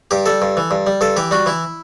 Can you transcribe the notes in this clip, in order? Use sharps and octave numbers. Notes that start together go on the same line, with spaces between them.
G2 G4
G3 A4
G2
E3
G2
G3
G2 A4
E3 G4
G3 F#4
E3 E4